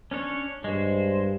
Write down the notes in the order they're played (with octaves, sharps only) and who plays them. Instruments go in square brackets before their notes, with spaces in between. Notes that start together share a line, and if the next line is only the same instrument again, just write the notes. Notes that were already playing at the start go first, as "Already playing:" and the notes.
[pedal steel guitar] C#4 D4 C#5
[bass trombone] G2 [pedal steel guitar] G#3 C5